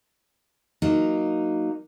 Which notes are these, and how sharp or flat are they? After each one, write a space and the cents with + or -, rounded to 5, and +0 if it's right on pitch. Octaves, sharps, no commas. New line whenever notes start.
F#3 +0 A#3 +0 D#4 +0